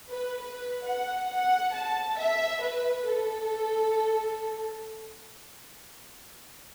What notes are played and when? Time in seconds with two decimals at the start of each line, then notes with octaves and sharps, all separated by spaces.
0.12 B4
0.42 B4
0.86 F#5
1.30 F#5
1.74 A5
2.19 E5
2.63 B4
3.06 A4